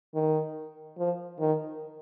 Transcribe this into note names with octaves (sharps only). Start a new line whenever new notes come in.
D#3
F3
D#3